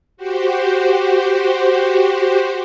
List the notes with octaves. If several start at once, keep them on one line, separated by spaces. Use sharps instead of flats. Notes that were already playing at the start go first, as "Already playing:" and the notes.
F#4 G4 C5